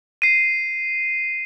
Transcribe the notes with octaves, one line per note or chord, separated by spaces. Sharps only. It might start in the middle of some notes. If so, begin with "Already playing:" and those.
C7 D#7